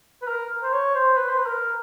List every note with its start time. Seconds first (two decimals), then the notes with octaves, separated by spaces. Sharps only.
0.22 B4
0.28 A#4
0.63 C5
0.73 C#5
0.95 C5
1.17 B4
1.29 C5
1.38 B4
1.46 A#4